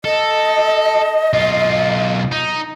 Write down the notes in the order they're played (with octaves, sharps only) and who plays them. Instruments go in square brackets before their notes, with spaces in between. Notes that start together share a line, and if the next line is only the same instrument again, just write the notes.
[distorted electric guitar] A4 [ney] D#5
[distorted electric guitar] B1 F4
D#4